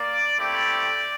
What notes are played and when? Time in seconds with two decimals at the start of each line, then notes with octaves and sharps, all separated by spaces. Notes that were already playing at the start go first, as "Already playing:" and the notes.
Already playing: A#3 D5
0.38 A3 C4 E4 G4 D5